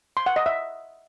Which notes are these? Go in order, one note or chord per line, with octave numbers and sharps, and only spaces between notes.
C6
F#5
D#5
E5